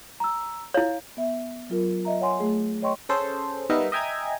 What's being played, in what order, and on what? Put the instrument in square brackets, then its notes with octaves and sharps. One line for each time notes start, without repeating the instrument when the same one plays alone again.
[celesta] A#5 E6
[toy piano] E4 C#5 [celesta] F5
[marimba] B3 E5
F#3 F4 A#4
D#5 E5 A#5
C#5 F#5 G#5 C6
A3 G#4
C#5 D#5 G5 C6 C#6
[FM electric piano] C#4 G#4 A4 C5
G3 B3 D#4 A#4 E5
D#5 E5 G5 G#5 A#5 G#6